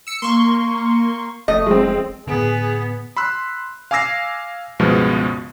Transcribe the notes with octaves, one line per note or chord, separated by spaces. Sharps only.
E6 C#7
A#3 C6 C#6
F1 A3 D#5
G#3 C4
A2 D3 B3 G#4
B5 C6 E6 F#6
F5 G#5 D6 E6 A#6 C7
C#2 G2 B2 F3 G#3 B3